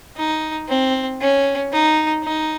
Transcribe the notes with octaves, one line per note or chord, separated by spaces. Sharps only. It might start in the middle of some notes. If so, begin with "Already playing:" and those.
D#4
C4
C#4
D#4
D#4